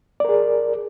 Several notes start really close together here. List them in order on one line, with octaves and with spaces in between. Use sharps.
D5 A#4 G#4